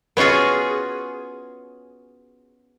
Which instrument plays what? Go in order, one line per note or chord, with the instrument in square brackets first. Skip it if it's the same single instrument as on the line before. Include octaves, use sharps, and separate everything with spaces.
[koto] B3 C#4 F4 F#4 G#4